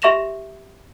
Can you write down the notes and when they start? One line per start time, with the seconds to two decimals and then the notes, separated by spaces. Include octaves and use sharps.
0.02 G4 E5 C#6 A#6 E7 F7